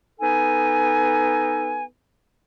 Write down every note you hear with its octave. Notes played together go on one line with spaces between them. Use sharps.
B3 D#4 A4 G#5